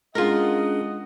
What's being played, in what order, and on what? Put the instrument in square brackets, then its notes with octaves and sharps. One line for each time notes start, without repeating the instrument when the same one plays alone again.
[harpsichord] G#3 [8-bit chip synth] C#4 D4 G#4 [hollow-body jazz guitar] F4 A#4 [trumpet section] D#5 F#5